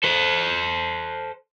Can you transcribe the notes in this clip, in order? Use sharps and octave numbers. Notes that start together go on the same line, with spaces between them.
A4 C5